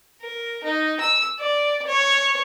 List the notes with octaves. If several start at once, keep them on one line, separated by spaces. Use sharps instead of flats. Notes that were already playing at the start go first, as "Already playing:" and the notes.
A#4
D#4
E6
D5
C#5